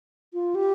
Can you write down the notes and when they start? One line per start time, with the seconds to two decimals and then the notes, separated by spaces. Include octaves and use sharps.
0.34 F4
0.55 G4